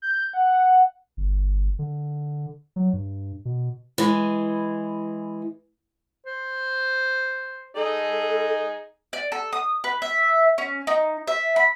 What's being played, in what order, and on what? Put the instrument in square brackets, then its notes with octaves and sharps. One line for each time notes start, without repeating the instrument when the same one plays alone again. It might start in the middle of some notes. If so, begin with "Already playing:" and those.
[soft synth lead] G6
F#5
[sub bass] G1
D3
F#3
G2
B2
[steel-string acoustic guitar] E3 G#3
[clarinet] C5
[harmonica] D#4 G#4 D#5 [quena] A4
[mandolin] D5
A4
D#6
B4
E5
C#4
D#4
E5
B5